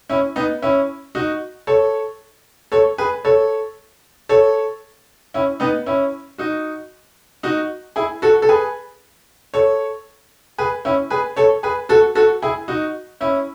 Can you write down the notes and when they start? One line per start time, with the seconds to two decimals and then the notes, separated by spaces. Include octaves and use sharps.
0.09 C#4 E4
0.36 B3 D#4
0.62 C#4 E4
1.15 D#4 F#4
1.67 A4 C#5
2.72 A4 C#5
2.98 G#4 B4
3.25 A4 C#5
4.29 A4 C#5
5.34 C#4 E4
5.60 B3 D#4
5.86 C#4 E4
6.38 D#4 F#4
7.43 D#4 F#4
7.96 E4 G#4
8.22 F#4 A4
8.42 A4
8.49 G#4 B4
9.54 A4 C#5
10.58 G#4 B4
10.85 C#4 E4
11.10 G#4 B4
11.36 A4 C#5
11.63 G#4 B4
11.89 F#4 A4
12.15 F#4 A4
12.42 E4 G#4
12.68 D#4 F#4
13.21 C#4 E4